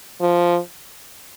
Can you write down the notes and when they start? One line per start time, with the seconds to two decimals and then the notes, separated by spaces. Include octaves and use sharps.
0.21 F3